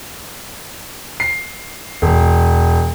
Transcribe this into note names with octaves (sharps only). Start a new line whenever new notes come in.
C7
E1